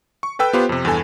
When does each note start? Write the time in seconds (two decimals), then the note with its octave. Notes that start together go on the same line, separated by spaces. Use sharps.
0.23 C#6
0.39 A4 B4 G5 E6
0.53 B3 F4 G4 B4 C5
0.69 F2 C3
0.85 E2 G2 A4 G#5